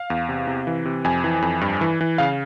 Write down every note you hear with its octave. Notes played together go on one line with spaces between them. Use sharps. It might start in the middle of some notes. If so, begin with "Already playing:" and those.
Already playing: F5
E2
C3
C3
E3
C3
F2 G#5
E3
F2
G2
E3
E3
C#3 F5